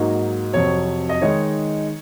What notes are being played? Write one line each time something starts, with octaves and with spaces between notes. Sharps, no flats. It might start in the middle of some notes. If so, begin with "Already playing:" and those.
Already playing: G#2 F#3 A#3 D#4
F2 C3 F#3 C#5
D#5
D#3 G#3 D#4 C#5